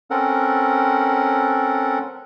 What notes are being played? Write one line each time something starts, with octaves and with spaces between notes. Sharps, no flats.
C4 C#4 A4 A#4 F#5